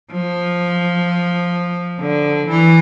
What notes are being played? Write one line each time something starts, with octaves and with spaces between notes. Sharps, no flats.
F3
D3
E3